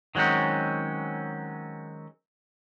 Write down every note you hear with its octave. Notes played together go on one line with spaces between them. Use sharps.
D#3 F#3 G#3 C4 C#4